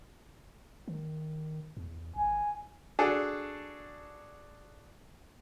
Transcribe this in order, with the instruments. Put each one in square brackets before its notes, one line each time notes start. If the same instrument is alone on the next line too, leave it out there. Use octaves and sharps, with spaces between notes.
[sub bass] D#3
E2
[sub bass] G#1 [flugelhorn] G#5
[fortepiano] D4 F#4 G#4 A4